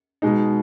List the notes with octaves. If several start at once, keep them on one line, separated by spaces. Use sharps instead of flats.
B2 G#3 D#4